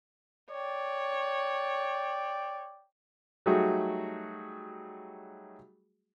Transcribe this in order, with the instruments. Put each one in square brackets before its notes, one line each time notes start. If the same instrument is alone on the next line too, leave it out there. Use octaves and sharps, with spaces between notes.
[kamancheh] C#5 [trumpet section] D5 G5
[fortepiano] F#3 G3 A3 D#4 F#4 G#4